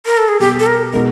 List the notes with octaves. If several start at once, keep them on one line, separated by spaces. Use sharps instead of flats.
A#4
A4
G#4
B2 G3 B3 G4
A4
A#4
B2 G#3 B3 D#4 A#4